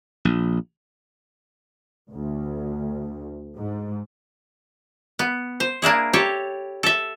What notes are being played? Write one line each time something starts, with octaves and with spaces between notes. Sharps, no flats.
A#1
D2
G#2
B3
C5
A#3 D4 E4 G#4
G4 A4 C#5
A4 E5